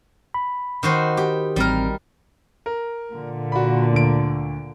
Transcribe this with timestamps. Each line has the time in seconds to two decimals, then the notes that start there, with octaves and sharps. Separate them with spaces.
0.34 B5
0.83 D#3 F#4 C5
1.17 G4
1.56 A1 G3 C4 A#4 F6
2.66 A#4
3.12 A#2 D3
3.52 F#4 B5
3.93 D2 D7